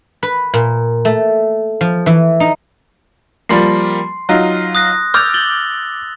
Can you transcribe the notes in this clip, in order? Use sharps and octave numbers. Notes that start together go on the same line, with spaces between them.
B4
A#2
A3
F3
E3
D#4
F3 G3 A#3 C6 C7
F#3 D#4 F4
D#6 F#6 A#6
D6 E6 F6 G6 A6 F7
A6 F#7 G7